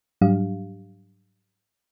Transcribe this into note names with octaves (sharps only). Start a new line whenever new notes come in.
G#2 F#3 G3 D4 G4 F5